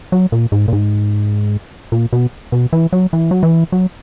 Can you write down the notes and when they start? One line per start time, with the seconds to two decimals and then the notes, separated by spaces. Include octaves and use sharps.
0.12 F#3
0.32 A#2
0.52 G#2
0.68 A#2
0.73 G#2
1.92 A#2
2.13 B2
2.52 B2
2.73 E3
2.93 F#3
3.13 E3
3.31 F#3
3.43 E3
3.72 F#3